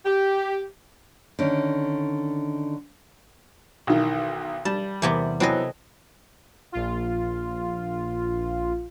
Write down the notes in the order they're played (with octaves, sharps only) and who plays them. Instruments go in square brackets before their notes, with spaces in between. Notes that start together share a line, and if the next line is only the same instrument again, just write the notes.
[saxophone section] G4
[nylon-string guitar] D3 D#3 C#4
[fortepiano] B1 D#3 E3
[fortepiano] G3 [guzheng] A5
[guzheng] E2 C3 B3
[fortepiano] E3 F#3 B3 [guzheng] C4 A4 D#5
[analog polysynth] A#1 F4